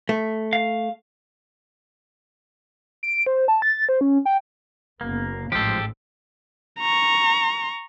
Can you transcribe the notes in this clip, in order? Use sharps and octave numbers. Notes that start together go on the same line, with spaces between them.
A3
F5
D7
C5
A5
A6
C5
C#4
G5
F#1 A#3 B3
A1 G#2 F3 G#3 G4 A4 C5
A#5 C#6